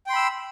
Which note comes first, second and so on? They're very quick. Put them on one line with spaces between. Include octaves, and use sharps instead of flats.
G5 C6 B5 E6